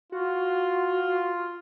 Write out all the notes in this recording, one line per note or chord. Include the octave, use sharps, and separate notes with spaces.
F4 F#4